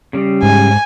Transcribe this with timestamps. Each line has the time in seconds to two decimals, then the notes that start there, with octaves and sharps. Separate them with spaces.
0.13 C#3 G3
0.43 G#2 G#5